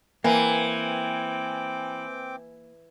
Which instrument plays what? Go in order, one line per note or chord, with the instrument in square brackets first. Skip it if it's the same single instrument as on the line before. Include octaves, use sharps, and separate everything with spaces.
[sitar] E3 [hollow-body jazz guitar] A#3 [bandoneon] C4 G5 D6 [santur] G#5